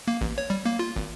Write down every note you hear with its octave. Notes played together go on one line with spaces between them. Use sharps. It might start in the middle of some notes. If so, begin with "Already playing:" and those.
A#3
A1
C#5
G3
A#3
F4
G#1